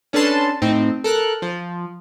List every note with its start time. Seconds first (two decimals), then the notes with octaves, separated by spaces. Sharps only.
0.13 C#4 D4 A4 B4 A5 C6
0.62 A2 C4 D#4
1.04 A4 A#4 F#6
1.42 F3